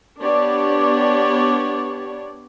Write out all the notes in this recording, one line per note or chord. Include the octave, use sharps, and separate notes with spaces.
B3 D4 G4 C#5 D5